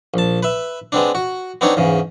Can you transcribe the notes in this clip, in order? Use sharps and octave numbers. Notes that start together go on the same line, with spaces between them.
A#1 A5
B4 E5
G#3 B3 C4 D4
F#4
B3 C4 D4 D#4 C#5
E2 G#2 C#3